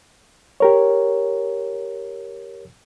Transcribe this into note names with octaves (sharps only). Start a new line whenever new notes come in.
G4 A#4 C#5